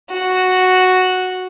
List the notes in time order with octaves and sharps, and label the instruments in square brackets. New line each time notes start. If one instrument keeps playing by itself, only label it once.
[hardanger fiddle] F#4